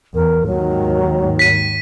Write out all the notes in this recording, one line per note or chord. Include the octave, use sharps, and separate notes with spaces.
E2 A#4
D#2 G#2 D#3 F#3
B6 D#7